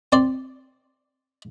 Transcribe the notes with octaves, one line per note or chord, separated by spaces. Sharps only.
C4 D5 C6